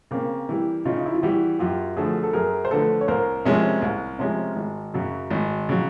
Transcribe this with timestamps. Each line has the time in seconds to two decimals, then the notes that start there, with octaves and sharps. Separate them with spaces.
0.11 C#3 A#3 C4
0.49 E3 G3
0.85 C#3 D#4 F4
0.97 D#4
1.06 E4
1.14 F4
1.22 E3 G3 E4 F#4
1.59 F#2 F4 G4
1.97 D3 F3 A3 F#4 G#4
2.24 A4
2.33 F#2 G#4 A#4
2.65 C5
2.71 D3 F3 A3 A4 B4
3.01 C#5
3.08 C2 A#4 C5
3.45 C3 F3 G#3 C#4
3.82 C2
4.19 C3 F3 G#3 C#4
4.56 G#1
4.94 F#2 C#3 F#3
5.30 G#1
5.69 C#3 F#3